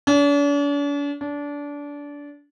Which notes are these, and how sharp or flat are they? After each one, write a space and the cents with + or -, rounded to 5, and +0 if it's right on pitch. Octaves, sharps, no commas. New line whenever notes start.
D4 -45
D4 -25